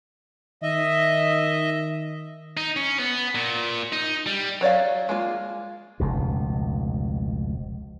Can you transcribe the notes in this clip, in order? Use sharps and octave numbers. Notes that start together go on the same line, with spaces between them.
D#3 D#5 E5
D#4
C#4
B3
A#2
D#4
G3
F#3 C#5 D5 F5
G#3 A#3 F4
F1 C#2 B2